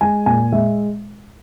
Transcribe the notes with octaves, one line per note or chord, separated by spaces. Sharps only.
G#3 G#5
A#2 G#5
G#3 E5